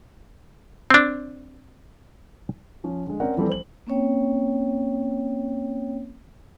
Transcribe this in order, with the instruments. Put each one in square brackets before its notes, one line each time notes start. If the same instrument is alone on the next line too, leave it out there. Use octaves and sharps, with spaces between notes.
[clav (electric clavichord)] C4 D4
[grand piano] F3 C#4
D3 G#3
C4 C#4 A#4 D5 F#5
E3 F3 G3 A3 C4 A4
C5 F#7
[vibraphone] A#3 C4 C#4 C#5 G5